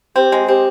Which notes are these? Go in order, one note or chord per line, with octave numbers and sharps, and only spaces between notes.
C4 G4
G#3
C4 G4